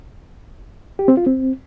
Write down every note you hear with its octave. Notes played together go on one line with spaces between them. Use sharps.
G4
C4
F4
C4